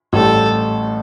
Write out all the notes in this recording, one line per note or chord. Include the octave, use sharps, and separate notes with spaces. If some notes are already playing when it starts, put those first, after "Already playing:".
A1 A2 G3 A4